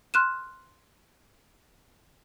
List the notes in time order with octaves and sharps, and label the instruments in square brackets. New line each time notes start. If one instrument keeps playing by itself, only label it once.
[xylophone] C6 F6 F#6 D#7 E7